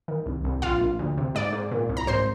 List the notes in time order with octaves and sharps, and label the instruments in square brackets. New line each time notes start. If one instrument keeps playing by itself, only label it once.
[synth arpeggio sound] D#3
C2
C2
A#1 F4 F5
A#1
D2
C3
G#2 D5
G#2
A#2
C2
A#5
G#1 C5 C6